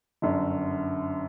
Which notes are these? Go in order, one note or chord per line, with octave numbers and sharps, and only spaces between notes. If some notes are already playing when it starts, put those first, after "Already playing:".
G1 F#2 D3